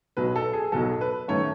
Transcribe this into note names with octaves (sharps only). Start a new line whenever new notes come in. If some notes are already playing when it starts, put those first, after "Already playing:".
B1 B2 F#3 B4
A4
G#4
B1 B2 F#3 A4
B4
F#2 D#3 A3 C#5